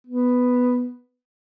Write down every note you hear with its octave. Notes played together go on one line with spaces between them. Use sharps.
B3